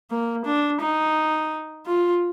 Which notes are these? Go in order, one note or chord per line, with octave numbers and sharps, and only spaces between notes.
A#3
D4
D#4
F4